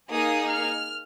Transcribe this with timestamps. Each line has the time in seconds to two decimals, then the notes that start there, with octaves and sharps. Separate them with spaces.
0.11 A#3 D#4 G#4 D#6
0.49 F6